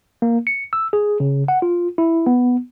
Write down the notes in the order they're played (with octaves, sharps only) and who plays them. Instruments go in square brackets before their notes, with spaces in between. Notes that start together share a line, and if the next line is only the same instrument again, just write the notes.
[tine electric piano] A#3
C#7
E6
G#4
C#3
F#5
F4
E4
B3